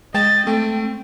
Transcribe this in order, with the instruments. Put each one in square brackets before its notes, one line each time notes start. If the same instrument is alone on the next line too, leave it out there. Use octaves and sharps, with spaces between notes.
[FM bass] G#3 [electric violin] D#5 [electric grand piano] G5 [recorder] A6
[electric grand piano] A3 [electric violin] C4 [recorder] G5